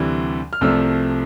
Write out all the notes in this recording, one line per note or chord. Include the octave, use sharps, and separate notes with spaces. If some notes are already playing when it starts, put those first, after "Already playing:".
Already playing: D2 C3 E3 G3
F6
C2 C3 F3 A3 E6